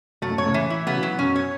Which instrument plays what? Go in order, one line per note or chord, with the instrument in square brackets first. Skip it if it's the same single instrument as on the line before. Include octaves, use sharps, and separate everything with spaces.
[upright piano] F#2 B2 [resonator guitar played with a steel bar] A3
[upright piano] A2
[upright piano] F#2 B2 [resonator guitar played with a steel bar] C#5
[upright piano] A2 C#3
[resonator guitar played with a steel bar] E3
E4
[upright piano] C#3 F#3 [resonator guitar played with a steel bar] B3
[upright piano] B2 E3
[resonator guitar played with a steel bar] F#3
[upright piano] F#2 B2 [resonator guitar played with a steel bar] C#4
[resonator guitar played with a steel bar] C#5